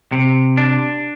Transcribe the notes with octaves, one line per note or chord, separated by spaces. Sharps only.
C3
D4